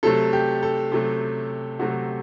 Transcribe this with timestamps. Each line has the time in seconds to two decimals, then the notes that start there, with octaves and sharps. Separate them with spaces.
0.03 C3 F#3 A3 A4
0.33 G4
0.63 A4
0.92 C3 F#3 A3
1.79 C3 F#3 A3 F#4